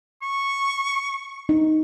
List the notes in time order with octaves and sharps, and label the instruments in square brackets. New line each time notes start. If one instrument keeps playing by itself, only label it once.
[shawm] C#6
[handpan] D#4